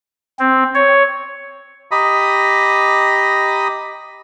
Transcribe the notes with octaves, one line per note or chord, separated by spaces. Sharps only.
C4
C#5
G4 D#5 A#5 B5 D#6